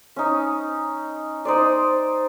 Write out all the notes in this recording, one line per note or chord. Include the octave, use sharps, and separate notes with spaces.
C#4 D#4
D#4 C5 D5